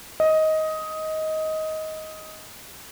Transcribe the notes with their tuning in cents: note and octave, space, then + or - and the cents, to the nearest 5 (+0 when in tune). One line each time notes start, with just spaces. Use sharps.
D#5 +15